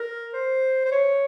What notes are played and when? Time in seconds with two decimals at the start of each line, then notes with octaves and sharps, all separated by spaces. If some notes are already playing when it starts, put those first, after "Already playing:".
Already playing: A#4
0.34 C5
0.85 C5
0.92 C#5